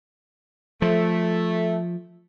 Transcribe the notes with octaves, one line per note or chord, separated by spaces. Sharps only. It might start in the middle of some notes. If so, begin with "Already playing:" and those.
F3 A3